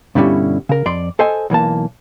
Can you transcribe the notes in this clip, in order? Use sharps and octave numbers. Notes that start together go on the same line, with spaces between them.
G2 B2 D3 G3 C#4 E4
C#3 A#4
F2 D5 C6
A4 C5 D#5 G#5
B1 E3 A#3 A5